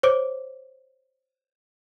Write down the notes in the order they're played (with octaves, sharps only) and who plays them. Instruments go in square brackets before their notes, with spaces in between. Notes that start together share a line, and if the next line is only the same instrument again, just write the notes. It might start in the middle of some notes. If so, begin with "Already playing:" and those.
[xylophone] C5 C#5 D6 D7